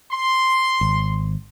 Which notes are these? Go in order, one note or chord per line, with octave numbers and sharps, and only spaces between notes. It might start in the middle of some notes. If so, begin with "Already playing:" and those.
C6
G#1